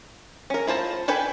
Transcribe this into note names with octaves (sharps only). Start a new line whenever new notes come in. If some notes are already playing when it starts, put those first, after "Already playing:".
C#4 A#4
E4 F4 C5 A5
A4 B4 G5 G#5 B5